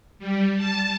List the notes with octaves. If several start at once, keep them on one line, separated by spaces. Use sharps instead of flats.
G3
A5